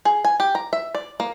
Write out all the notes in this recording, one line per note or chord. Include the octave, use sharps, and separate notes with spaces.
G#4
G#5
G4
A#5
E5
D5
A#3